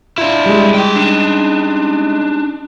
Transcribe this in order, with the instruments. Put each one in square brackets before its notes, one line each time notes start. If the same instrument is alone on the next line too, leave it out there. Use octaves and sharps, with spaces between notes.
[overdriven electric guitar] D4 E4 [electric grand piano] F4
[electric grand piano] G3 G#3
[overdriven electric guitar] G#4 G5
D4 D#4